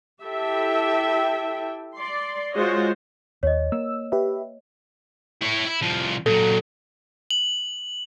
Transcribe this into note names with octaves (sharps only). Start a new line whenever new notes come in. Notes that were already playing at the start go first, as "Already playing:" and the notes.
E4 G4 A4 E5 G5
D5 C6
G#3 F4 F#4 C5 C#5 D#5
D#2 C#5 D#5
A#3 E6
G4 B4 E5
E4 C#5
E4
C2 F3
A#2 F#3 A4
F#7